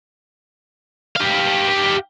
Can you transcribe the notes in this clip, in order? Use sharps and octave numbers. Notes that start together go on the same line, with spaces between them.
G4 F5